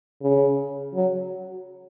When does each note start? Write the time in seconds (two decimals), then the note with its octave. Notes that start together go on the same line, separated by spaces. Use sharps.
0.22 C#3
0.94 F#3